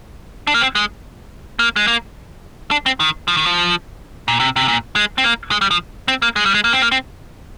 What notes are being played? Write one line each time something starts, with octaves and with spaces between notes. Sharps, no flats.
D4
A#3
C4
G#3
A#3
G#3
A#3
D4
C4
D#3
F3
D#3
F3
A#2
C3
C3
A#2
G#3
C4
A#3
G#3
G3
F3
C4
A#3
G#3
G3
G#3
A#3
C4
A#3
C4